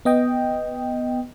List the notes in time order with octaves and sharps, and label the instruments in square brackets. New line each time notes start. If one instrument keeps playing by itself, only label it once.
[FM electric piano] B3 D#5 G5